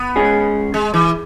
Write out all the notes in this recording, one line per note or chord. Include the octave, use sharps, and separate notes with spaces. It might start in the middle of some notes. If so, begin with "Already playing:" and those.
Already playing: B3
G#3 C#4 G#4
G#3
E3